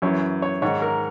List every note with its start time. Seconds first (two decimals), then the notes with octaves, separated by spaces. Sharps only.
0.02 F#2 E3 C#5
0.42 C#5
0.62 G#2 D#3 C#5
0.82 A#4